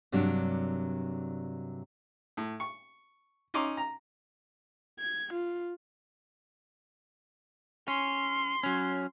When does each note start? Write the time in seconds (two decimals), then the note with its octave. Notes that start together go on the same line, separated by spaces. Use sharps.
0.12 G2 C3 F#3 A#3 D4
2.37 A2
2.60 C#6
3.54 C#4 D#4 C6 D6
3.77 A#5
5.00 G#6
5.33 F4
7.88 C#4 C6
8.63 F#3 C#4